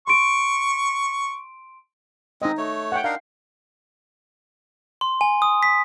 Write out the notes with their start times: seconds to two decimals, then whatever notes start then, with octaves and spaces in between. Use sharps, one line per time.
0.08 C6 C#6 D7
2.42 G#3 C4 D#4 D#5
2.57 A3 C#5
2.92 F#5 G5
3.04 D4 D#4 A#4 F5
5.01 C6
5.21 G#5
5.42 D#6
5.63 B6